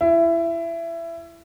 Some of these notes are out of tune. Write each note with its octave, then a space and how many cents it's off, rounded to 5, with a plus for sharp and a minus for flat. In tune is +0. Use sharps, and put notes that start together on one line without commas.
E4 +20